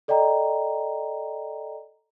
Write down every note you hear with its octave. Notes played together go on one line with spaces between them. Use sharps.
A4 D5 D#5 G5 A#5